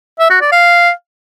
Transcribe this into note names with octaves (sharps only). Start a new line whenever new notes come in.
E5
F#4
D5
F5